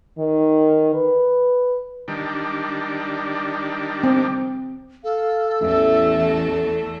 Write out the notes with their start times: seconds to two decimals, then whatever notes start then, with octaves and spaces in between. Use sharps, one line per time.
0.18 D#3
0.94 B4
2.08 D#3 G3 D4
4.03 C4
5.04 A4 F5
5.61 A1 E2 A3 E5
6.49 A4